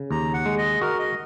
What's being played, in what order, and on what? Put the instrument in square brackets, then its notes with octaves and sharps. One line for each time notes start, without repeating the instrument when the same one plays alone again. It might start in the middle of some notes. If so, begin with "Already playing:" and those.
Already playing: [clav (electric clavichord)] C#3
[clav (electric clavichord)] D#2 [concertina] A#5
[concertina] F#5
[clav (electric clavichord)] G#3
[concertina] D#5
[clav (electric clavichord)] F#4 [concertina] A#4
[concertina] D#5